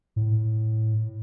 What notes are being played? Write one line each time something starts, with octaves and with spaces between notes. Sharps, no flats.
A2